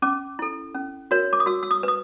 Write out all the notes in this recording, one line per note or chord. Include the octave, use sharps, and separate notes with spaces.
C#4 D6
E4 A4
C#4
F#4 A#4 C#5
D6
D#6
F#4 E6
E6
D#6
B4 D#6